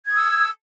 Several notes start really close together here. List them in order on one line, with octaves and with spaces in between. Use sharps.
G#6 D#6 E6